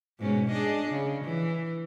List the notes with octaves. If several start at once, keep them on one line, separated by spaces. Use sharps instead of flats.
G#2 B2 C#4
D4 G#4 D#5
C#3
E3